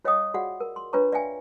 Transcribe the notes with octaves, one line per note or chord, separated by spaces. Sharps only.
F4 C#5 D#5 F5 G5 D#6
F4 F#4 G#4 D5 F5 F#5
A#4
C6
D4 F4 B4 C#5 A#5 C#6
D5 E5 F5 G5 G#5